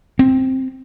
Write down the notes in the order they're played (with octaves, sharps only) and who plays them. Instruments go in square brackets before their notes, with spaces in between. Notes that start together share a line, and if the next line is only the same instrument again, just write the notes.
[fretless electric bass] C4